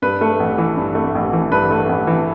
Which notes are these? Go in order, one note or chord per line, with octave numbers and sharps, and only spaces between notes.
G2 B4
A3
A1
E3
G2
A3
A1
E3
G2 B4
A3
A1
E3